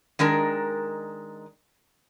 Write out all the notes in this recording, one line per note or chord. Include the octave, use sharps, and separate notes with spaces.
D#3 G#3 D4 A#4